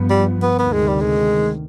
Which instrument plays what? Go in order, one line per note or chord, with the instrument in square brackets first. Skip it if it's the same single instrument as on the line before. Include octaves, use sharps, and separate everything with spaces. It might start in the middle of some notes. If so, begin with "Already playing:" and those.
Already playing: [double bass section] G2 F3 B3
[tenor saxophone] G3
B3
[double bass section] D2 C3 D#3 [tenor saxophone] B3
[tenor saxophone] G#3
G3
G#3